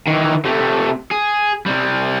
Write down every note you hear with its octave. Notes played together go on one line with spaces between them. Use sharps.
D#3 E3
C3 A3
G#4
C3 G3